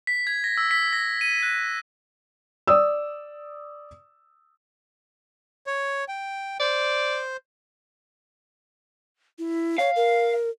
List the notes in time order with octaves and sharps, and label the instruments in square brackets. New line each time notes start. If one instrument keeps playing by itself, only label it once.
[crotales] B6
G#6
A#6
E6
B6
A#6
D#7
F#6
[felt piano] D5 D#6 E6
[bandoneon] C#5
G5
[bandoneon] C5 [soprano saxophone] D5
[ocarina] E4
[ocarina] C#5 [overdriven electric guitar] F5
[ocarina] A#4